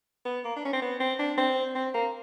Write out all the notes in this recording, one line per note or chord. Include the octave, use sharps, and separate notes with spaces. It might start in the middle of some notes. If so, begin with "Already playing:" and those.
B3
A#3
D4
C#4
C4
B3
C4
D4
C4
C4
A#3